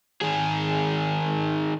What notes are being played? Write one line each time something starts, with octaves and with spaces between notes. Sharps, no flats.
D#3 G#4